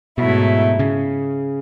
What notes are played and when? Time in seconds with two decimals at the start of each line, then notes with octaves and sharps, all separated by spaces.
0.18 G#2 B2 F#3 A3 E4
0.79 C#3